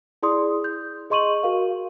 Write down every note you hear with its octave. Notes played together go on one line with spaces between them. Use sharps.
E4 G#4 D5 C6 D#6
G6
G#4 D#5 C6 C#6 D#7 F#7
F#4 A#4 F5